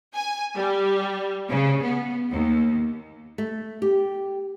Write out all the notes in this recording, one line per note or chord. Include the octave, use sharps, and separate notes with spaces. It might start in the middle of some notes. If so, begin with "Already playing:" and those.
G#5
G3
C#3
B3
D#2
A3
G4